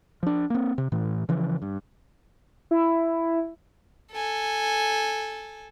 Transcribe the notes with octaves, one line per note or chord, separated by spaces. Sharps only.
F3 D4
A#3 C4
C3
A2 E3
C#3 E3 F3
G2
E4
A4 G#5